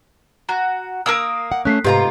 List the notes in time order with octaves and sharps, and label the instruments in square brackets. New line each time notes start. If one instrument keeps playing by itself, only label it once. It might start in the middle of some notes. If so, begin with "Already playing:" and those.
[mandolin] F#4 [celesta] A#5
[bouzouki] A#3 [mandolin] A#4 D#6 E6
[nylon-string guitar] F#5
[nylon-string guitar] A3 C#4 [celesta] F#6 B6 C7
[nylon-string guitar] G#2 [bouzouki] C3 F4 A#5 [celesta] G4 B4 D#5